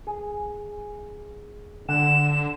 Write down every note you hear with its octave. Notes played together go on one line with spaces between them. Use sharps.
G#4
D3 F#5 E7